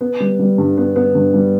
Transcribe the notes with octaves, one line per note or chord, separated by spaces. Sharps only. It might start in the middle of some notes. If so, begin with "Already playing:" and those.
B3
G3
G3
G2
B3
B3
G2
G3